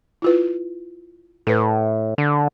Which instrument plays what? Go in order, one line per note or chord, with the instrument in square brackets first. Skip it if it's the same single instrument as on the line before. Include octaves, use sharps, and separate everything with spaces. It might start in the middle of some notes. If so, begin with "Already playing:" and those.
[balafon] E4 F4 B4
[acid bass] A2 [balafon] A4 B4
[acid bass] D3